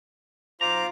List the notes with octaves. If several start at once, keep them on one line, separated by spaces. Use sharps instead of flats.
B1 F4 C5 A#5 D6